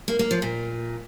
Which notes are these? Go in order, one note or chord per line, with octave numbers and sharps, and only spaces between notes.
A#3
A#3
F3
A#2